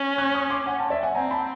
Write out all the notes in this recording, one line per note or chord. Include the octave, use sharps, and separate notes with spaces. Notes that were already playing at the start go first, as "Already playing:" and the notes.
Already playing: C#4
F#6 G#6
C#6 D#6
C6 D6
F#5 G#5
G5 A5
D5 E5
F#5 G#5
C4 G#5 A#5
A5 B5